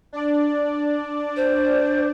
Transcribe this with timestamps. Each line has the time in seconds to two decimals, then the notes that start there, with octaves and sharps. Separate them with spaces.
0.13 D4 D5
1.37 C5